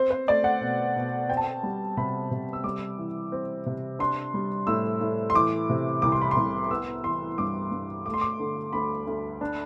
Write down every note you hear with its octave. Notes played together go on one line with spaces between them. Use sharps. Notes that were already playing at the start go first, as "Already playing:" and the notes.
Already playing: C4 C5
C5
A3 D5
F#5
B2
B2
C4 G5
A5
G5
G3
C3 B5
C3
E6
G3 D6
E3
C4
C3
D4 C6
G3
A2 E6
A2
C6
E3 D6
C3
C2 D6
C6
B5
C6
C2
B3 E6
E3 C6
G2 D6
G2
A3 D6
C6
D6
D3
D2 B5
D2
D4